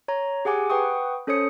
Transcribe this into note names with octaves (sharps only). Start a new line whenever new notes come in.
C#5 A#5
G4 G#4 F#5 G#5 D6
B4 F#5 G5 C#6 D#6
C#4 A4 C5 C#5 D#6 C#7